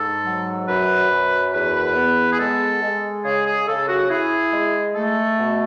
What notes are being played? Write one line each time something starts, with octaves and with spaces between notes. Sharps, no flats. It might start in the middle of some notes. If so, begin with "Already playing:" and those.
Already playing: G#2 A4
F#3
F#2 B4
F#2
E2 B4
B3
G#4
G#3 A4
G#3
C#3 G#4
G#4
C#3 A4
F#4
E4 G#4
G#3
A3 A4
B2